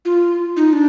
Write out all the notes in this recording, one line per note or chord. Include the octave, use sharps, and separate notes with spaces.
F4
D#4
D4